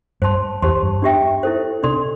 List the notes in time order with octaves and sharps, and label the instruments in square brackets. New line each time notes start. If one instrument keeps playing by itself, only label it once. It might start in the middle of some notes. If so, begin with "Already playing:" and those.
[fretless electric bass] G2 [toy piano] C5 A5 C6
[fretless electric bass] E2 [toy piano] G4 C5 A5 C6
[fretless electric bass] G2
[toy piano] D4 G4 E5 G5
E4 A4 C5
[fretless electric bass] C3 [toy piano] D4 A4 D5 C6